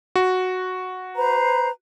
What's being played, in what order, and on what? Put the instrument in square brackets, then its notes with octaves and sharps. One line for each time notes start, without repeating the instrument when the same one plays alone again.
[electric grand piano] F#4
[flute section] B4 C5 A#5